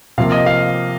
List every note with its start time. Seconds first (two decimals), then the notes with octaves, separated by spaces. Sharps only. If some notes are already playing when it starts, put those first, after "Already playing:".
0.18 C3 F3 A#3 F5
0.32 D#5
0.46 F5